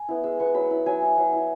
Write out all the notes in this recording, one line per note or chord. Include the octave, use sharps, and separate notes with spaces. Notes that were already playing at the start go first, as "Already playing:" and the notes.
Already playing: G#5
B3 E4
G#3 E6
B3 E4 C#6
F#3 B5
E4 B5
F#3 G#5
E4
F#3
E4